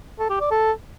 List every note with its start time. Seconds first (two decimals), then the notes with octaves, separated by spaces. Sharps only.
0.19 A4
0.30 G4
0.40 D5
0.51 A4